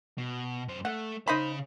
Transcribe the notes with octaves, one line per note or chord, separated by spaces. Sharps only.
B2
F#2 C5
A3 F#5
C#3 D#4 C5 F5 B5